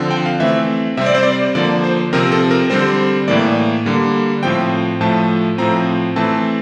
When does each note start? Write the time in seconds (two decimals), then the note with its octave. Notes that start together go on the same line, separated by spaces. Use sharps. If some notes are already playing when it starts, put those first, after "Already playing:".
Already playing: D3 F3 C4
0.11 G5
0.26 F5
0.40 E3 A3 C4 E5
0.97 C3 G3 C4 E5
1.06 D5
1.14 C5
1.23 D5
1.55 D3 F3 A#3 D5
1.84 C5
2.13 C3 F3 C4 A#4
2.32 A4
2.51 A#4
2.70 D3 G3 C4 C5
3.28 A2 E3 A#3 D5
3.86 D3 G3 A#3
4.43 A2 F3 C4 G5
5.01 A2 F3 A3 A5
5.58 A2 F3 C4 A#5
6.16 E3 A3 C4 A5